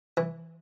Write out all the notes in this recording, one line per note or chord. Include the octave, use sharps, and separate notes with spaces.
E3